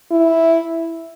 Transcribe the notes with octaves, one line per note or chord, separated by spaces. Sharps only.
E4